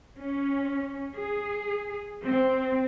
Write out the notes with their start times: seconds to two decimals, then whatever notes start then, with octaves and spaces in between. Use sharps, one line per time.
0.20 C#4
1.16 G#4
2.26 C4